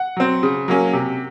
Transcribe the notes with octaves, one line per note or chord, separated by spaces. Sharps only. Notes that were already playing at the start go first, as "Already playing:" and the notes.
Already playing: F#5
F#3 C4
C#3
F#3 A#3 C#4
C3